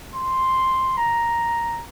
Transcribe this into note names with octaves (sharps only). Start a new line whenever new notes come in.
C6
A#5